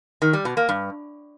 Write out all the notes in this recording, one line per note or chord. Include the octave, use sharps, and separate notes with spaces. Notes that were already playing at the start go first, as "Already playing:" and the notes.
D#3
G3
B2
A#3
G2